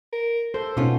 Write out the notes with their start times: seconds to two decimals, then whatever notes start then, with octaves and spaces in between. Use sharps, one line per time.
0.13 A#4
0.54 A4 C5
0.77 B2 B3 C#4 D#4 F4